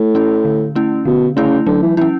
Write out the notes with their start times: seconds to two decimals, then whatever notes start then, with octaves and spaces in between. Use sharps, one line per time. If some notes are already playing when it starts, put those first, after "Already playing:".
Already playing: A2
0.15 A3 C#4 E4
0.45 D3
0.76 A3 C#4 E4
1.05 B2 D3
1.36 C#3 A3 C#4 E4
1.67 D3 F#3
1.82 E3
1.97 E3 C#4 E4